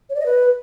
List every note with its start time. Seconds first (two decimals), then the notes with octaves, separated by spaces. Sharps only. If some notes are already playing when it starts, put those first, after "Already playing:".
0.10 C#5
0.15 D5
0.20 D#5
0.26 B4